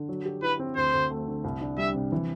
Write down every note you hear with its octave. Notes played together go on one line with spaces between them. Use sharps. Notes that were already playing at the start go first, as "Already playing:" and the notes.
Already playing: D3
F#3
G4
E4 B4
C4
D2 C5
D2
A3
D3
C2
D4
G3 E5
C3
E3